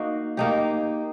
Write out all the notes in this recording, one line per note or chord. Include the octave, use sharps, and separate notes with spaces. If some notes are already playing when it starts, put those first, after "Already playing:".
Already playing: A#3 D#4 F#4
A#3 D#4 G4